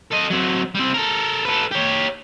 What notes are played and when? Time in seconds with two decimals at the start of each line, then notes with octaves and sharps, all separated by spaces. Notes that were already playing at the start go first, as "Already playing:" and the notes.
0.12 A4 D#5
0.31 F#3 C4
0.75 G3 C4
0.94 A4 A#4
1.45 A4 B4
1.71 G4 C#5